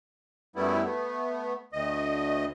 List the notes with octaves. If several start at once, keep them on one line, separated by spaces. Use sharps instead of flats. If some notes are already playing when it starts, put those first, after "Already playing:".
F#2 G3 A3 B3 E4
A3 B3
D2 D#5